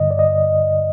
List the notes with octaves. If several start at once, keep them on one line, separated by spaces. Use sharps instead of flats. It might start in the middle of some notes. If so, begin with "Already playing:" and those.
Already playing: G2 D3 D#5
D5
D#5